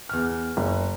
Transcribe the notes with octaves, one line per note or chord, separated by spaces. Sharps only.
E2 F6
F#1